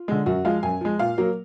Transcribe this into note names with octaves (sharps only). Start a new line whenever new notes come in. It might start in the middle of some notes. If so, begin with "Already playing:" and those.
Already playing: F4
D3 G#3
F#2 F#4
F3 G#3 F5
F#2 G#5
F3 G#3
A#2 F5
F#3 A#3